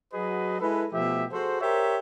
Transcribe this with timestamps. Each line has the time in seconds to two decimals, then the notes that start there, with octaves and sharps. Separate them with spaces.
0.13 F#3 F#4 G#4 B4 D#5
0.61 G#3 E4 A4 B4
0.93 B2 F3 A3 G4 E5
1.32 F#4 G#4 A4 C5
1.61 G4 A#4 C5 C#5 E5